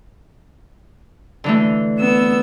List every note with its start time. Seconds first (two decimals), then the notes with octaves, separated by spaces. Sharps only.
1.44 D3 E3 A3
1.98 B3 E6